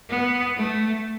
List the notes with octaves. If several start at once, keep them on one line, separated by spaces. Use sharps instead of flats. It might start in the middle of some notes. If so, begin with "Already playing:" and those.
B3
A3